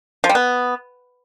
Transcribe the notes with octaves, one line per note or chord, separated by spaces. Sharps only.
F3
G3
B3